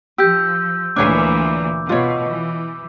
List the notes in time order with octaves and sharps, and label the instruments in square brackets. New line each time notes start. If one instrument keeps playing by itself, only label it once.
[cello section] F3 [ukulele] G4 [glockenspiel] E6 G6
[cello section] D2 A#2 E3 [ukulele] D4 C#5 G#5 [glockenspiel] D6
[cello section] B2 [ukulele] F4 C#5
[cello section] E3